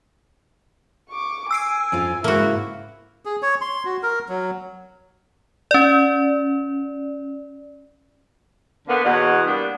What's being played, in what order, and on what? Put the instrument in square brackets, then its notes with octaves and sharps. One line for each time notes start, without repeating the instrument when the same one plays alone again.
[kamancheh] C#6 D6
[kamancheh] G#5 [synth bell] E6 C7 D7
[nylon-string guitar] F2 C#4 F4
[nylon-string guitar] G#2 C#3 [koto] A#3 F#4 [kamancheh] E4
[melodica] G#4
C#5
C6
F#4
A#4
F#3
[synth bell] C#4 D5
[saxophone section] D3 A#3 B3
E2 B2 C#5 D#5 F#5
G3 A#3 B3 D4